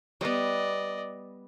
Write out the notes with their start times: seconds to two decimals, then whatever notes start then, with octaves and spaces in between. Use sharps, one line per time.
0.21 G3 B3 D5 D#5